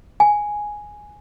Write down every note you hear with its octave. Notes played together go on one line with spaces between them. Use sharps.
G#5